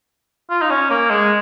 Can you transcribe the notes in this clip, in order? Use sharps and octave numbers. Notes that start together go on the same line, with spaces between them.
F4
D#4
C#4
A#3
G#3